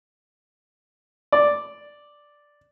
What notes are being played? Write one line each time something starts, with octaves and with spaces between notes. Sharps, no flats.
D5